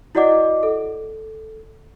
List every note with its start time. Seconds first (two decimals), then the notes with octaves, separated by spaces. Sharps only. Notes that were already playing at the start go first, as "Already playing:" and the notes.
0.15 E4 F#4 D5 D#5 F#5 D6
0.63 A4